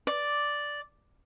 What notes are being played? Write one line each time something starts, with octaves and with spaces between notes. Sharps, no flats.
D5